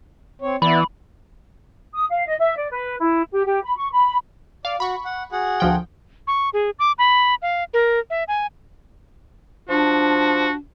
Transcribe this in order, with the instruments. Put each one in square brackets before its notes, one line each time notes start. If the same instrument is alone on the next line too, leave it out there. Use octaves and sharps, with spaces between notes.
[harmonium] C4 C#5
[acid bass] E3 [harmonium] B3 E4 D5 [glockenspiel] B5
[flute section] D#6
F5
D#5
E5
D5
B4
E4
G4
G4
B5
C#6
B5
[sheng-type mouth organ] D5 [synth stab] F5
[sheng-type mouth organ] F#4 [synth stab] B5 C#6
[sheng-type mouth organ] F#5
F#4 G#4 F#5
[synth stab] D2 F3 G5
[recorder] C#6
G#4
D6
B5
F5
A#4
E5
G#5
[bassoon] F3 [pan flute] D4 [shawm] F#4